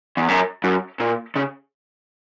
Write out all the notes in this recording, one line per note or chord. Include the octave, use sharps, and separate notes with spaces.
E2
F#2
F#2
A#2
C#3